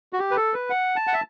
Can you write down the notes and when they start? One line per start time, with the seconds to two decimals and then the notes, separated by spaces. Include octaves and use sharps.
0.13 F#4
0.19 G4
0.31 B4
0.37 A4
0.54 B4
0.70 F#5
0.96 A5
1.07 F#5
1.14 E5